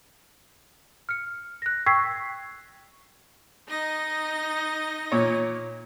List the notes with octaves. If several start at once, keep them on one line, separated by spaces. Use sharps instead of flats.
F6 C#7
F#6 A#6
G5 C#6 E6 G#6 B6 C7
D#4 D#5 A#6
A#2 C#5